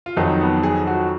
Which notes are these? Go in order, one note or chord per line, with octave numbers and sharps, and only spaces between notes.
F4
F2 D#3 F#3 D#4
B3
G#4
F#4